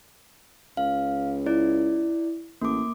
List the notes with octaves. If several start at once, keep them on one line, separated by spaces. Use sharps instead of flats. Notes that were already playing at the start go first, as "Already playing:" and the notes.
C#2 F5
E4 D5
A1 A#3 D6